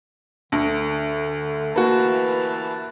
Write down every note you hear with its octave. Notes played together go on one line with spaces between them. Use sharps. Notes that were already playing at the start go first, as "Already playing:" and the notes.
D2 D3
E3 A#3 F#4 B4 A5